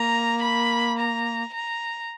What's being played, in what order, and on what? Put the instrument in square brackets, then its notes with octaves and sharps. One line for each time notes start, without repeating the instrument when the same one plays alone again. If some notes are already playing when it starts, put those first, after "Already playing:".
Already playing: [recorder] A#3 [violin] A#5
[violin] B5
A#5
A#5